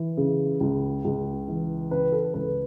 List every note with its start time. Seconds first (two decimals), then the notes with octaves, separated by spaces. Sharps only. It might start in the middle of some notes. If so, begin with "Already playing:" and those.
Already playing: E3
0.17 C#3
0.60 C#2
1.05 C#2
1.48 E3
1.91 C#3 B4
2.12 A4
2.34 C#2 B4